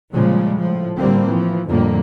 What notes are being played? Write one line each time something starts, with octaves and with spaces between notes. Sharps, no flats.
A#2 C#3 F3 G3 G#3
A2 F3
A2 D3 G3 A#3 C4
E3 F3
F2 A2 D3 G3 A#3